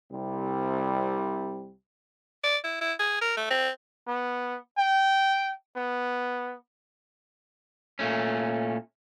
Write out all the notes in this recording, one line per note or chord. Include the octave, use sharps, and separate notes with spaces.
C2 C3 G3
D5
E4
E4
G#4
A#4
A3
C4
B3
G5
B3
A#2 A3 C#4